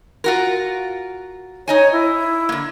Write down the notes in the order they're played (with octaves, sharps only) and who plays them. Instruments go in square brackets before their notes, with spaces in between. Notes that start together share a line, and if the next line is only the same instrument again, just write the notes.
[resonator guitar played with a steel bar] F4 F#4 A#4
[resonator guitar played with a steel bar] D#4 D#5 G#5 [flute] C#5
[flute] E4
[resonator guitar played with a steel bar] D3 A#3